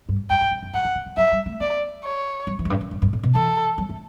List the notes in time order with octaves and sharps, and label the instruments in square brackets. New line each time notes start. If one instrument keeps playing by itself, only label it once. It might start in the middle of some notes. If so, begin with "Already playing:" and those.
[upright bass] G2
[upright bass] F#2 [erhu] G5
[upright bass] F#2
F#2
F#2
[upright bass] G2 [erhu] F#5
[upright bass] D3
D3
E3
[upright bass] F#3 [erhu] E5
[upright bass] G3
A3
[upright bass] B3 [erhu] D5
[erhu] C#5
[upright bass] F#3
E3
F#2
G2
F#2
F#2
G2
A2
B2
[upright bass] E3 [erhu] A4
[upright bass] F#3
A3